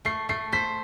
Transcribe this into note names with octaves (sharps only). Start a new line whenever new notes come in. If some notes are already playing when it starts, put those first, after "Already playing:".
A3 C7
A3 C7
C5 B6